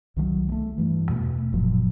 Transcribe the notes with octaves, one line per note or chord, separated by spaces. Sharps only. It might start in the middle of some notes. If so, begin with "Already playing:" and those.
C2 D#3 E3 F#3
G#3 A3
G2 E3
E2 B2 A3
F#1 A#2 F3 F#3